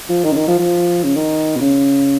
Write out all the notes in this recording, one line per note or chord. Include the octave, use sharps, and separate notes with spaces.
F3
D#3
C#3
D#3
F3
F3
C#3
D#3
B2
C#3